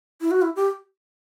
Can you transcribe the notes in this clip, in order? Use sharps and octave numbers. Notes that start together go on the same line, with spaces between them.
E4
F#4
E4
G4